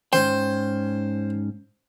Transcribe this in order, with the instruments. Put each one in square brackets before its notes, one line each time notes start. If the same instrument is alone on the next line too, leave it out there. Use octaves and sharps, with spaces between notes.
[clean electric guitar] G#2 C#4 G5 [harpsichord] C5